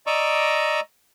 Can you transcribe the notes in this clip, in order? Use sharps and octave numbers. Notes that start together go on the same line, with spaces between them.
D5 D#5 A#5 C#6 D6 E6